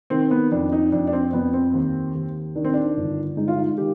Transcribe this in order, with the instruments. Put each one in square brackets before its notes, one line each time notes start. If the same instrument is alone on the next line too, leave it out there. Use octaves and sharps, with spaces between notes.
[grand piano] D#3 C4
B3
F2 D4
D#4
F2 D4
D4
C4
F2 B3
C4
D#2
D#2
D#3 D4
C4
D4
G1
G#3 D#4
F4
D#4
D#3 G4